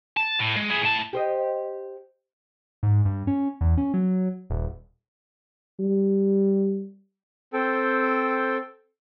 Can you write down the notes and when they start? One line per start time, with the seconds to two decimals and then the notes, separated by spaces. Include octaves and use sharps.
0.17 A5
0.39 A2
0.57 G#3
0.70 E4 G#4
0.82 A2 A5
1.13 G4 C5 D#5
2.83 G#2
3.05 G2
3.27 C#4
3.61 E2
3.78 C#4
3.94 F#3
4.50 D#1
5.80 G3
7.53 C4 A4 G5